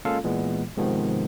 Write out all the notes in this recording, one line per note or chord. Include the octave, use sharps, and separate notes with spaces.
G#3 A#3 C#4 F4 A4 F5
A#2 E3 G#3 B3
G#2 C3 D#3 F3 G#3 B3